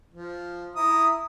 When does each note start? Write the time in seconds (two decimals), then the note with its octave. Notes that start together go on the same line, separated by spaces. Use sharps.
0.14 F3
0.76 E4 A#5 D#6